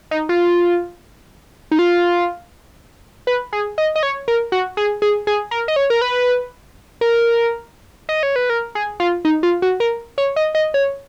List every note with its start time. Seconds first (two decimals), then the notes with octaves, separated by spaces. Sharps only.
0.11 D#4
0.29 F4
1.71 D#4
1.79 F4
3.27 B4
3.53 G#4
3.78 D#5
3.96 D#5
4.03 C#5
4.28 A#4
4.52 F#4
4.77 G#4
5.02 G#4
5.27 G#4
5.51 A#4
5.68 D#5
5.76 C#5
5.90 A#4
6.02 B4
7.01 A#4
8.09 D#5
8.23 C#5
8.36 B4
8.50 A#4
8.75 G#4
9.00 F4
9.25 D#4
9.43 F4
9.62 F#4
9.80 A#4
10.18 C#5
10.36 D#5
10.55 D#5
10.74 C#5